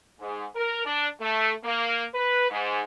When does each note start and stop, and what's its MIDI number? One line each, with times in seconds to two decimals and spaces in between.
0.20 0.45 44
0.55 0.82 70
0.85 1.08 62
1.20 1.52 57
1.64 2.05 58
2.14 2.48 71
2.50 2.80 44